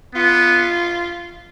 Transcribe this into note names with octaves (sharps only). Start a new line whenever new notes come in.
B3 F4